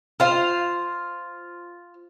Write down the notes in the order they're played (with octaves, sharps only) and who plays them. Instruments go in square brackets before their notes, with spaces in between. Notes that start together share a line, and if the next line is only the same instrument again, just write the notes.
[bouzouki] F4 C5 F5